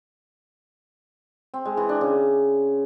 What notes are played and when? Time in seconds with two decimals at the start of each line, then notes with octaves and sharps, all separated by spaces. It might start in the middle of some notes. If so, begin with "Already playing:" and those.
1.54 C4
1.65 G#3
1.77 E3
1.89 D4
2.01 C#3